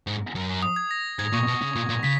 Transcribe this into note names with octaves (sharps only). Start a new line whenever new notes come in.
G#2
F#2
D#6
G#6
A#6
G#2 G#6
A#2 C#6
B2
C#3
A#2
A#2
C#3 B6